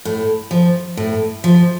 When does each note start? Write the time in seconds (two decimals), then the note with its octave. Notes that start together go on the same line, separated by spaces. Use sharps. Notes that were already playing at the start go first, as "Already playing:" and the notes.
0.05 A2
0.51 F3
0.97 A2
1.44 F3